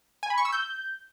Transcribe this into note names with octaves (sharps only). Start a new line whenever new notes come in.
G#5
B5
C#6
E6
G6